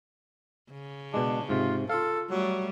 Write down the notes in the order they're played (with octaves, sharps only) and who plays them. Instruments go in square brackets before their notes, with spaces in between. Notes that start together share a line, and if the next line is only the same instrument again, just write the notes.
[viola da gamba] C#3
[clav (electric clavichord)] B2 G#3 [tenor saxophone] D4
[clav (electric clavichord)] G#2 C3 [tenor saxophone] F4
[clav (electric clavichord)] F4 F5 [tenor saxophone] A4
[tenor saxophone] F#3 [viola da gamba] G3 A3